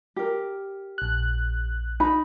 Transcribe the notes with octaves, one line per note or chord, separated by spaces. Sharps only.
G4 A#4
A#1 F#6
D#4 B5